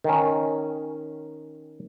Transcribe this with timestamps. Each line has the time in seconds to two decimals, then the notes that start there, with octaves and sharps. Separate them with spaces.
0.04 D#3 C#4